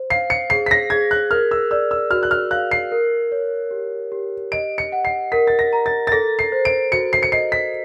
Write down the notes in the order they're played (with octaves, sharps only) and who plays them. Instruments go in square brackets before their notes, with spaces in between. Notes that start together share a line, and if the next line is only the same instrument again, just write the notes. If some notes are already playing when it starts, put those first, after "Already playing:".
Already playing: [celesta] C5
[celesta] F5 [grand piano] C7
[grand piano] C#7
[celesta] G#4 [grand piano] C7
[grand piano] B6
A#6
[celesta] G#4 [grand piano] G#6
[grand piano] F#6
[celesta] A#4 [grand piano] F6
[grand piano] E6
[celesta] D5 [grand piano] E6
[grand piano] E6
[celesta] F#4 [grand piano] F6
[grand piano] F#6
F6
[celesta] F5 [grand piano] F#6
[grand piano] C7
[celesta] A#4
C#5
G4
G4
[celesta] D#5 [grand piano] D7
[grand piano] C#7
[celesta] F#5
[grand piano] C7
[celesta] A#4 [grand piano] B6
[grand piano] A6
A#6
[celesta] A#5
[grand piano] A6
A6
[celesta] A4 [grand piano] A#6
[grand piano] C7
[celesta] C5
[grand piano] D7
[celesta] F#4 [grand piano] C#7
[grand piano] C7
C#7
[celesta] D#5 [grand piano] C7
[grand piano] B6